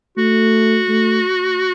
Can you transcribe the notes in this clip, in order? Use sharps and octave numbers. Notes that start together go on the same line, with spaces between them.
A3 F#4
A3